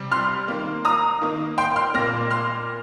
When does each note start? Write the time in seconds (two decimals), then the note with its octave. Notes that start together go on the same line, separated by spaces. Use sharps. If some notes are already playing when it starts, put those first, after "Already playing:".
Already playing: C3 G3 C4
0.12 C6 F6
0.48 D#3 A#3
0.85 A#5 D#6
1.22 D#3 A#3
1.58 G5 C6
1.76 C6 F6
1.94 A#2 A#3 F6 A#6
2.31 C6 F6